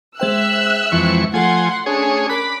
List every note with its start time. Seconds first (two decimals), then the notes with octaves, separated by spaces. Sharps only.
0.20 G#3 C5 E5 G5 E6 F#6
0.92 F2 E3 C#6
1.34 F3 A3 A4 F#5 G#5 C6
1.86 C#4 D4 G#4 C#5
2.29 A#4 B5 D6 F#6